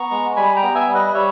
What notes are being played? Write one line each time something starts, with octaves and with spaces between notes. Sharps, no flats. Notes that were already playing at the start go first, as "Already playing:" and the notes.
Already playing: B3 A#5 C#6
G#3
G3 G#5 B5
G5 A#5
B3
E5 G#5
G3
B4 D#5
G3 C#5 E5